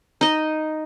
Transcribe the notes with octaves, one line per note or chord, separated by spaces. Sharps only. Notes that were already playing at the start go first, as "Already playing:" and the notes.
D#4 D#5